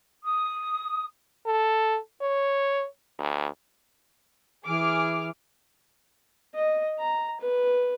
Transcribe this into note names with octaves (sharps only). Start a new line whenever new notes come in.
D#6
A4
C#5
D2
E3 G#4 D6 F6
D#5
A#5
B4